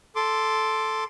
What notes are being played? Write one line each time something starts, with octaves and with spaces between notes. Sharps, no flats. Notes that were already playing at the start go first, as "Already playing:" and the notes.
A4 C6 D6